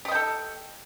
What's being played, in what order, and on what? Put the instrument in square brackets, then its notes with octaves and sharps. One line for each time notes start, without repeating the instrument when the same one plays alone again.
[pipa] G4
D#5
G5
A4